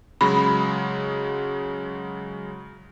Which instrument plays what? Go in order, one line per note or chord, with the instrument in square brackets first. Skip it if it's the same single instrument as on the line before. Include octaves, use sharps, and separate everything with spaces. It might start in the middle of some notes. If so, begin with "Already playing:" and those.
[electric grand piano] C#3 F#3 G#3 [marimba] B5